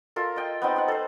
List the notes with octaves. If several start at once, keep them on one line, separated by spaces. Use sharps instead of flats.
F4 A4 A#4
D#5 G5
B3 C4 D#4
D#4 F#5
A4 C5